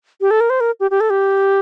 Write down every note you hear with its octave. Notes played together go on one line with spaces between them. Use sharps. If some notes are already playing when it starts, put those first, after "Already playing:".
G4
A4
A#4
C5
A#4
G4
G4
A4
G4